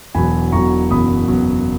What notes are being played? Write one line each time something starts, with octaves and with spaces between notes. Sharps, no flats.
E1 E2 B2 F#3 G#5 B5
E1 E2 B2 F#3 A#5 C#6
F#1 E2 B2 F#3 B5 D#6
F#1 E2 B2 F#3